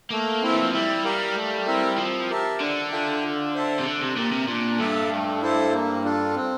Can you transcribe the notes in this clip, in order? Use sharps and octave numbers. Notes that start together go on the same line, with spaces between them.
A3 A#3
C4 E4
E3
F3
G3 E4
G4 A#4 F5
A3
C4 E4 A#4 E5
F3 C4
G4 A#4 E5 A5
D3 D4
F4 A4 E5 G5
F4
C5 E5 A5
C3
D3 D4
C3
A#2 G4 A#4
C3
A#2 D4
G2 A4 E5 A5
A3
E4 A4 C5
A#3
D4 F4 A4
C4